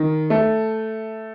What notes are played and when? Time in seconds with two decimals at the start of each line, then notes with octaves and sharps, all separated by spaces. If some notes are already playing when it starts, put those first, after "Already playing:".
Already playing: D#3
0.30 A3